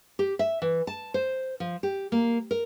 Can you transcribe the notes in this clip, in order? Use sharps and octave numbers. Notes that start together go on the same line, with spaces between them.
G4
E5
E3
A5
C5
F3
G4
A#3
A#4